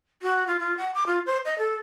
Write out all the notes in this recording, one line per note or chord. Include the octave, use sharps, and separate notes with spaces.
F#4
F4
F4
F#5
D6
F4
C5
D#5
A4